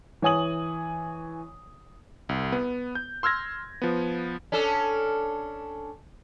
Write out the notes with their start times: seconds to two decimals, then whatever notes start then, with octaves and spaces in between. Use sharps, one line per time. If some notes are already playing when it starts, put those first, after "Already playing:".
0.22 E3 C#5 G#5 D#6 F#7
2.29 C2
2.52 B3
2.95 G6
3.23 C6 E6 F6 G#6 A#6
3.82 F3 B3
4.52 C#4 D4 A4